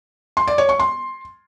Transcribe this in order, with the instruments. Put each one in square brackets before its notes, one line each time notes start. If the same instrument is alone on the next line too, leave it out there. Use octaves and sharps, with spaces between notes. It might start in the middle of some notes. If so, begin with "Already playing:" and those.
[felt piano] C6
D5
C#5
C#6
C6